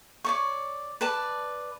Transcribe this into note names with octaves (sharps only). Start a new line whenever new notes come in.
C#5 D5 C#6
B4 D5 A5